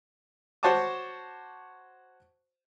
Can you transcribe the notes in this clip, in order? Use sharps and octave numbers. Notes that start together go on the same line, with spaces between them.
F#4 C5 C#5 F#5 A5 D6